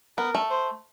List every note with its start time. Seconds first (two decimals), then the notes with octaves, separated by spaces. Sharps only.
0.18 B3 A#4
0.35 A3
0.50 C5